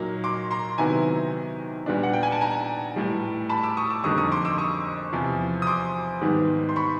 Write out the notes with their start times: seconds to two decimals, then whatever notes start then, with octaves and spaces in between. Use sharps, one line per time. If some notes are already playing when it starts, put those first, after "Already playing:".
Already playing: A#2 F#3 A#3 D#4
0.24 C6 D6
0.51 A#5 C6
0.78 C3 D#3 F#3 B3 E4 G#5 A#5
1.86 A#2 G3 B3 D4
2.03 F#5
2.13 G5
2.23 G#5
2.32 A5
2.41 G#5 A#5
2.96 A2 E3 G3
3.49 A5 B5
3.63 D6 E6
3.77 C#6 D#6
3.90 D6 E6
4.04 F2 D3 G3 A#3 D#4 C#6 D#6
4.18 C#6 D#6
4.31 C6 D6
4.45 D6 E6
4.58 C#6 D#6
5.13 E2 C3 F3
5.62 D#6
5.67 C6 D6
6.21 G#2 D#3 G3 B3
6.69 C6
6.76 B5 C#6